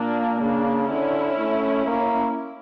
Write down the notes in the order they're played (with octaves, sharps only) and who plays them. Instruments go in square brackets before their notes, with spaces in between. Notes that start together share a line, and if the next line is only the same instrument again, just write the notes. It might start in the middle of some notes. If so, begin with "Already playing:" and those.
Already playing: [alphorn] A#2 [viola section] A#3 D4
[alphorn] C#3 [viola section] A#3 D4
[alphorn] D3 [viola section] C#4 E4
[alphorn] A3
A#3